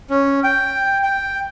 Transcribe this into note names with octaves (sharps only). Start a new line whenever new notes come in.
C#4
G5
G5